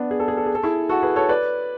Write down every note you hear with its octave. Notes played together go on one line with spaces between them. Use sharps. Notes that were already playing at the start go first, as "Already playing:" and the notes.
Already playing: B3 D4
G#4
A4
G#4
A4
G#4
A4
E4 G#4
F#4 A4
G#4 B4
A4 C#5
B4 D5